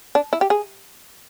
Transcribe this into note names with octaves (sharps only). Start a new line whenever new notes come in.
D4
E4
G4
G#4